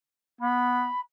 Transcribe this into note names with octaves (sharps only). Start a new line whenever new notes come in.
B3 B5